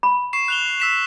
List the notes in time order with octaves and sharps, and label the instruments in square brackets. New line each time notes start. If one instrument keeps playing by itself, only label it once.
[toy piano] B5
[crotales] C#6 C7 E7
F#6 F7 G7
E6 B6 E7